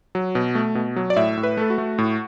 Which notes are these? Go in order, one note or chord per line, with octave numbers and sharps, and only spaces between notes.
F#3
B2
A3
B2
F#3
D5
A2 E5
A2
B4
A3 A4
F#4
A3
A2